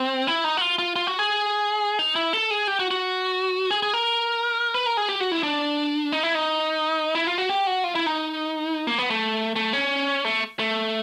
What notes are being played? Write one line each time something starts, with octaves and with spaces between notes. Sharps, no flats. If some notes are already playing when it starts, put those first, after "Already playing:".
Already playing: C4
E4
D#4
F#4
F4
F4
F4
F#4
G#4
D#4
E4
A4
G#4
G4
F#4
F#4
G#4
G#4
A#4
B4
A#4
G#4
G4
F#4
E4
D4
D#4
E4
D#4
E4
F4
F#4
G4
F#4
F4
E4
D#4
A#3
B3
A3
A3
C#4
A3
A3